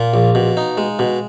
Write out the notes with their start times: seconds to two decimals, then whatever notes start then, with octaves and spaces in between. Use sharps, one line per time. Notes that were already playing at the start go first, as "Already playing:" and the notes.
Already playing: A#2 F4
0.14 A#1
0.35 B2
0.57 D#4
0.78 G#3
0.99 B2